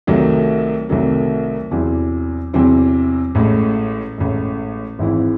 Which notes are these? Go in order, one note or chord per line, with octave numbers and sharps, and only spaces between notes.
C2 C3 D#3 F#3 A3
C2 C3 D#3 F#3 A3
E2 C3 F#3 C4 E4
E2 C3 F#3 C4 E4
A1 A2 G#3
A1 A2 G#3
G#1 G#2 E3 C4 E4